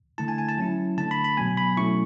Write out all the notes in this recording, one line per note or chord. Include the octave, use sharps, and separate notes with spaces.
D3 A3 E4 A5
G#5
G#5
A5
F#3 C#4 E4
D3 A3 D4 A5
B5
B5
B2 F#3 B3 G#5
B5
B2 F#3 A3 C#4 E4 C#6